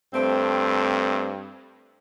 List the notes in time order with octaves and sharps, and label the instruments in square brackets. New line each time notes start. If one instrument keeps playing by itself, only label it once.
[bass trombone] G2 [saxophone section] A3 C4